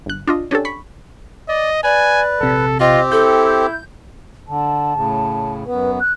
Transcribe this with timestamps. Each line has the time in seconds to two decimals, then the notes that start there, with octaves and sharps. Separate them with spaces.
0.06 G1 F#6
0.27 D4 F4 D#5
0.51 C#4 D4 G4 A4
0.65 B5 C#6
1.49 D5 D#5
1.84 B4 D5 G#5
2.41 A#1 C3 A4
2.80 C4 F4 G4 D#5
3.12 E4 A4 G6
4.48 D3 A5
4.94 A2 C#3
5.66 F#2 B3 B4
6.00 F#6